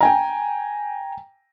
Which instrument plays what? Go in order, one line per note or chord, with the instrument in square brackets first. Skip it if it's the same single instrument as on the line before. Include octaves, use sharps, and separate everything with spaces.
[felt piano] G5 G#5 A#5